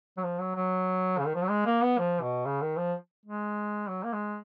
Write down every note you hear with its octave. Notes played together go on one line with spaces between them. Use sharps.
F#3
F3
F#3
F#3
C#3
D#3
F3
F#3
G#3
A#3
B3
F3
B2
C#3
D#3
F3
G#3
F#3
A#3
G#3